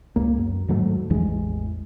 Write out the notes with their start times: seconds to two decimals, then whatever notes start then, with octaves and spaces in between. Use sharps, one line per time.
0.16 C#2 A#3
0.38 F#2
0.68 D#2 G#2 F#3 A3
1.10 A1 E2 E3 G#3